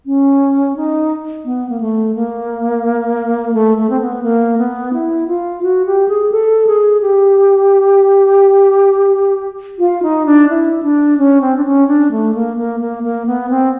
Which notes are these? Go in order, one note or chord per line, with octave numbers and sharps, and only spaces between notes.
C#4
D#4
B3
A#3
A3
A#3
A3
A3
C4
B3
A#3
B3
E4
F4
F#4
G4
G#4
A4
G#4
G4
F4
D#4
D4
E4
D4
C#4
C4
D4
C#4
D4
A3
A#3
A#3
A#3
A#3
B3
C4